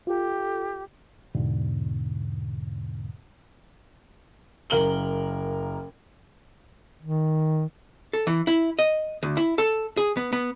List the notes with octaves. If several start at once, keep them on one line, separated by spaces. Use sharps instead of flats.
F4 G4 A4
E2 G#2 B2 D3
F#1 A#4 F#7 G7
D#3
A4
E3
E4
D#5
D2
E4
A4
G#4
B3
B3